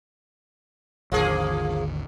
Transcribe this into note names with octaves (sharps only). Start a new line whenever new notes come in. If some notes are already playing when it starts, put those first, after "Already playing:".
G#1 D#2 D3 F3 A#3 G#4